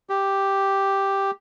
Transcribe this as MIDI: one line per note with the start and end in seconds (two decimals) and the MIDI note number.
0.09 1.31 67